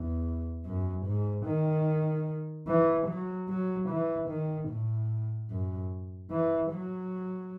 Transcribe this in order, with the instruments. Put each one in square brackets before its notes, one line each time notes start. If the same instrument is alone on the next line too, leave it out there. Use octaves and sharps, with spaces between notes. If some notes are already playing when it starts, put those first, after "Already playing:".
Already playing: [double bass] E2
F#2
G#2
D#3
E3
F#3
F#3
E3
D#3
A2
F#2
E3
F#3